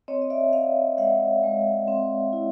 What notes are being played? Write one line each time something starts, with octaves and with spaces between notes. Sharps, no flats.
C4 C#5 D#5
D#5
D5 E5
C4 D#5 F5
G#3 E5 F#5
G#3
C4
E4